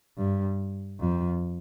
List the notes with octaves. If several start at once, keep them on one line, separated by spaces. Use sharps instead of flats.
G2
F2